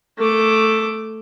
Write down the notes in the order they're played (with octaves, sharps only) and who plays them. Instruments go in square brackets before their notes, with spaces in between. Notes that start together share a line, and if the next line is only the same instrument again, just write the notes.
[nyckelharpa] A3 D6